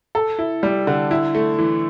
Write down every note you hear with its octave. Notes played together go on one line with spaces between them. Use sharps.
A4
E4
G3
D3
E4
A3
E3